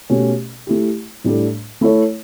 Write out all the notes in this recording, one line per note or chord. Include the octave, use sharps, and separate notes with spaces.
B2 A3 C#4 G4
A3 E4 G4
A2 G3 D4 A4
A3 E4 A4 C#5